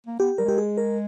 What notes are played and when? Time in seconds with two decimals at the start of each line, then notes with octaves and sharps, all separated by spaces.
0.07 A#3
0.19 B3 G4
0.38 G3 A#4
0.45 G#3 G4
0.58 G#4
0.77 A#4